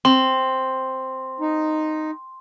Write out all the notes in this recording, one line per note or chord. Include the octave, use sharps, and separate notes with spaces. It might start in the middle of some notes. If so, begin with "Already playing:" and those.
C4 C6
D#4